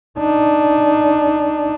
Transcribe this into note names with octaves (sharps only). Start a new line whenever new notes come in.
D4 D#4